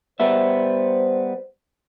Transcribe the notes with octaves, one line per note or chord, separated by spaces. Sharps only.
G3 B3 C5 E5